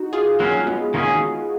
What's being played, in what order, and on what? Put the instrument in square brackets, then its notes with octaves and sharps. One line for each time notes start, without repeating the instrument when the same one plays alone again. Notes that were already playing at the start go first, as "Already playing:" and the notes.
Already playing: [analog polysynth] D#4 F#4
F4 G#4
[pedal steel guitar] F#3 A#3 C#4
[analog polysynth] G#3 B3
[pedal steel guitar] D#3 A#3 C#4 G#4